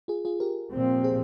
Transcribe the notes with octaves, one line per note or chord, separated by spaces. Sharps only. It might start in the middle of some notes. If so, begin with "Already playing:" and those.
F4 G#4
F4 G#4
G4 A#4
A#2 F3 C4
G#4 C5